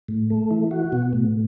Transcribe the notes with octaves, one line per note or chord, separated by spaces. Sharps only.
A2
A3
E3
F#4
B2
A2